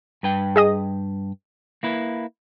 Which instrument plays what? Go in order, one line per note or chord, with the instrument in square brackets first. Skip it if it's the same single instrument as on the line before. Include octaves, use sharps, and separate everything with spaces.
[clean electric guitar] G2 B4 G5
[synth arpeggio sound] G#4 D#5 D#6
[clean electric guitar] A#3 E4 B4